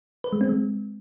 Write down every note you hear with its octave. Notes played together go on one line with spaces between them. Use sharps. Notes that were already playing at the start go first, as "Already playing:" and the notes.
B4
G#3
C4
G#3